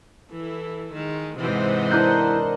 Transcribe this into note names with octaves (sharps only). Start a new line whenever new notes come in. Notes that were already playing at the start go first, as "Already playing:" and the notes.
E3 E4 A4
D#3 G#3
G#2 C3 E3 C5 D#5 F#5
D4 E4 A#4 F#6 G6